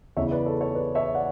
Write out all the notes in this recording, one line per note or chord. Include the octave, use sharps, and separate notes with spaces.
E2 C#3 E3 C#5 E5
B4 D5
A4 C#5
A4 C#5
B4 D5
C#5 E5
D5 F#5